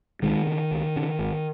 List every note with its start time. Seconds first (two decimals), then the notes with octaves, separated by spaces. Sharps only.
0.22 C#2 D#3 G#3
0.47 C#3
0.71 C#2
0.96 C#3
1.19 G#1